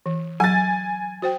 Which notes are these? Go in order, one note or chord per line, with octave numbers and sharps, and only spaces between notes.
E3
F#3 G#5 A6
F#4 C5 G5